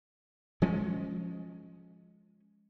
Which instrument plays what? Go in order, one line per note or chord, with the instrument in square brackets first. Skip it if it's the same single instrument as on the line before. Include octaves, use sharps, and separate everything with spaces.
[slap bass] F3 G#3 C#4